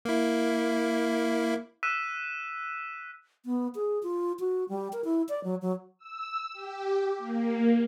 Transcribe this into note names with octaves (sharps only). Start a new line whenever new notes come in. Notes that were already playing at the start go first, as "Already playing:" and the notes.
A#3 E4
E6 F#6 B6 D#7 E7
B3
G#4
F4
F#4
G3
A#4
E4
D5
F#3
F#3
E6
G4
A#3